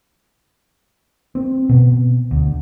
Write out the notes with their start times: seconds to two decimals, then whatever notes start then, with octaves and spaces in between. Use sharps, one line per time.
1.35 C4
1.69 B2
2.31 D2